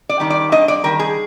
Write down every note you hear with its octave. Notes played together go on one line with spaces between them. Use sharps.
D5
D#3 G3
D5
G2 D#5
D5
D#3 G3 A#4
G#4